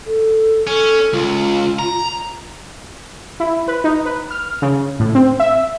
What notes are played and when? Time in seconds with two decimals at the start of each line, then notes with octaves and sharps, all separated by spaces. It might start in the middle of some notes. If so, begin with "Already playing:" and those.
0.06 A4
0.67 C#4 A4
1.13 C#2 F4
1.79 A#5
3.40 E4
3.68 B4
3.84 D#4
4.05 B4
4.31 F6
4.62 C#3
5.00 A2
5.15 C4
5.40 E5